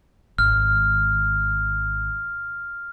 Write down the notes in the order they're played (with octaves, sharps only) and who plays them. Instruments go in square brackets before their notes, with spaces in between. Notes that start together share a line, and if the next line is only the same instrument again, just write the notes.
[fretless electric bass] G#1 [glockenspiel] F6